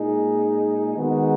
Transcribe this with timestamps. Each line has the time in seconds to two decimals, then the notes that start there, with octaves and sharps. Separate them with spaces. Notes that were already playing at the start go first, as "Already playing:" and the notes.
Already playing: A#2 G#3 D#4 G#4
0.97 D#3 G#3 B3 D#4 F#4